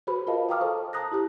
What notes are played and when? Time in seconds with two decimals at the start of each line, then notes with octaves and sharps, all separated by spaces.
0.07 F#4 G#4 B4 C5 B5
0.27 F4 A#4 C5 D#5 F5 A5
0.49 F5 G5 A#5 D6 D#6 F6
0.60 A4 C5 A5 C#6
0.93 A5 A#5 D#6 F#6 A#6
1.12 E4 G4 F#6